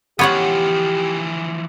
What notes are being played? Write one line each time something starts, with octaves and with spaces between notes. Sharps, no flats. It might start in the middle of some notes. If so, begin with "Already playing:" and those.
E3 F3 B3 G4 C#5 F#5